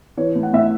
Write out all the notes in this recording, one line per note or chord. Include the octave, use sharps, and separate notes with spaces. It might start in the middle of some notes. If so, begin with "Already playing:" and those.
E3 C#5
A2
F#5
A2 E5